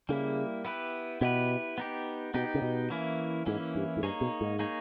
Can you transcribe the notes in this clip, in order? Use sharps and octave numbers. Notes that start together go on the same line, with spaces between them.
C#3 G3 A#3 E4
B3 E4 G4 B4
B2 B3 E4 G4 B4
B3 D#4 G4
B2 B3 D#4 G4
C#3
B2
E3 A#3 C#4 E4
G#2 E3 A#3 C#4 E4
G2
G#2
G2 A#3 D#4 G#4 C#5
B2
G#2
A#3 D#4 G#4 C#5